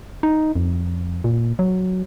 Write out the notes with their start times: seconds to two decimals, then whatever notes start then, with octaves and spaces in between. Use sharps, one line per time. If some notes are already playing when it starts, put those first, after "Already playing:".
0.23 D#4
0.56 F2
1.24 A#2
1.59 F#3